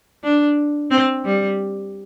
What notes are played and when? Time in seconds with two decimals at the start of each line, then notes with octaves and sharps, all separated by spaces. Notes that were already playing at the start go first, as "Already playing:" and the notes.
0.24 D4
0.91 C4
1.25 G3